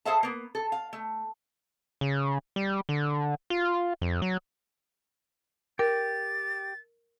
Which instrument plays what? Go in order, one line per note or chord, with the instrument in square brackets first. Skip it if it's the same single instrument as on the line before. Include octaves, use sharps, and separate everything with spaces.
[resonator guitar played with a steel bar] G#4 A4 C5 E5 F5 A5
A#3 B3
A4
F5
A3
[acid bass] C#3
G3
D3
F4
F2
F#3
[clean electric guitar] G4 [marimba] A#4 [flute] A6